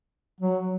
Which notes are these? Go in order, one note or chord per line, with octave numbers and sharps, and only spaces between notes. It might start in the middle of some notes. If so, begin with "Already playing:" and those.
F#3